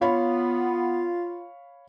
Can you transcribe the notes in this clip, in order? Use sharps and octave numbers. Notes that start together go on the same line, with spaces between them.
B3 F4 C#5 F5 B5